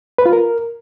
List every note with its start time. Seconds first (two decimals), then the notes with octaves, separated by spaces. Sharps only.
0.18 B4
0.26 F4
0.33 A#4